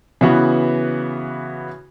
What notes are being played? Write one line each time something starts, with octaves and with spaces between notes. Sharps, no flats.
C#3 E3 B3 F#4